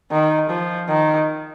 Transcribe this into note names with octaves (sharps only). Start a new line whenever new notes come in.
D#3
F3
D#3